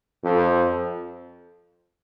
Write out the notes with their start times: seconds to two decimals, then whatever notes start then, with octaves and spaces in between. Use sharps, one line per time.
0.24 F2